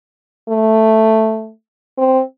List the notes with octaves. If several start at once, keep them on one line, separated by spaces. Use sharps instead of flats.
A3
C4